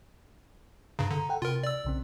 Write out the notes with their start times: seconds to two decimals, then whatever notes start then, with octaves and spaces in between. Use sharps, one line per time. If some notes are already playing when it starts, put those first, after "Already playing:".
0.99 G2 C#3 A#5
1.11 D3
1.29 A4 F#5 G5
1.42 C3 F4 A#4
1.63 D5 E6
1.85 B1 C#3 C4